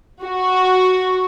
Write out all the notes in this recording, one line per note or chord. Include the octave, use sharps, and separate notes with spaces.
F#4